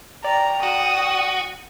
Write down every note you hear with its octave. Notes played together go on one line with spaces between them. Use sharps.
D5 G5 A#5
F#4 D#6